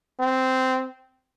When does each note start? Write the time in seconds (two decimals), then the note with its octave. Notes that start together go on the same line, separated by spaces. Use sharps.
0.20 C4